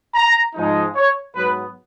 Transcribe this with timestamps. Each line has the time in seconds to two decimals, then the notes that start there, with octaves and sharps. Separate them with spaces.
0.15 A#5
0.54 G#2 F3 G#3 D#4
0.94 C#5
1.34 G#2 F#3 B3 B4